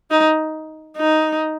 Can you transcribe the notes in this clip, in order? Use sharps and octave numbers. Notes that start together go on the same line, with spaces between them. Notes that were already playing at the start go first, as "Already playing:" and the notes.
D#4
D#4